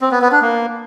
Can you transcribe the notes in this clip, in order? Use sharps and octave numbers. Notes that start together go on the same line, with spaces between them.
C4
B3
B3
D4
A#3